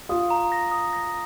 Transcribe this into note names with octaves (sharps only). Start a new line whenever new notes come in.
F4 D#6
A#5
A#6
D#6
A#6